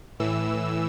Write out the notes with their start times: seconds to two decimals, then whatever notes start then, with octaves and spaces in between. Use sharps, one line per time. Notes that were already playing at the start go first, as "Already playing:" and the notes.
0.20 A2 E3 E6